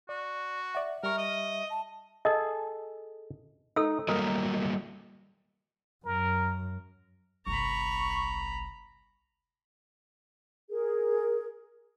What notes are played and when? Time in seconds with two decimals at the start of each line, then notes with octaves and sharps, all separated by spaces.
0.09 F#4 D5
0.75 D5 E5 F#5
1.03 G3 A#4 C#6
1.18 D#5
1.70 A5
2.25 G#4 A4 D#5
3.76 D#4 A4 E6
4.08 F#3 G3 A#3 A#4 D#5
6.05 F#2 A#4
7.47 G1 C2 A#5 B5 C#6
10.70 G#4 A#4